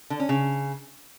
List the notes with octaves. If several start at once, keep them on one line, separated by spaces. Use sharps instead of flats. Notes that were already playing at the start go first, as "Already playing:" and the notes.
D3
C#4
C#3